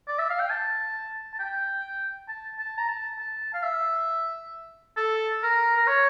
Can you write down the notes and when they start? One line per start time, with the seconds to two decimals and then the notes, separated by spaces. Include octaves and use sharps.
0.08 D5
0.19 E5
0.30 F5
0.40 G5
0.50 A5
1.34 A5
1.39 G5
2.29 A5
2.59 A5
2.78 A#5
2.88 A5
3.18 A5
3.54 F5
3.63 E5
4.97 A4
5.43 A#4
5.76 A#4
5.87 C#5